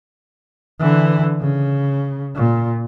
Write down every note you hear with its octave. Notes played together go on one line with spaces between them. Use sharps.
D3 E3
C#3
A#2